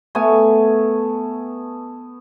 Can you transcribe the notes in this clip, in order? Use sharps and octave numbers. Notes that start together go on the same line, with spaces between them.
A3 B3 G#5